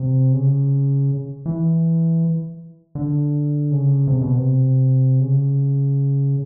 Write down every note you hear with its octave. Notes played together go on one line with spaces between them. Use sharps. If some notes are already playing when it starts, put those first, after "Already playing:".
Already playing: C3
C#3
E3
D3
C#3
C3
B2
C3
C#3